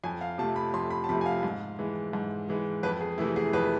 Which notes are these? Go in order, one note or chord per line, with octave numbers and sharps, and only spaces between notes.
F2 G#5
F5
C3 F3 A3 A5
B5
F2 C6
B5
A5
C3 F3 A3 B5
G#5
F5
G#2
E3 G#3
G#2
E3 G#3
F2 B4
G#4
C3 E3 A3 E4
G#4
F2 B4